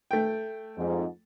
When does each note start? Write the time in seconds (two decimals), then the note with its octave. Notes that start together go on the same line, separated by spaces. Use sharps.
0.11 A3 G5
0.78 F2 G#2